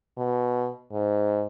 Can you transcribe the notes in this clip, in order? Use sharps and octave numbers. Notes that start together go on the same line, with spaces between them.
B2
G#2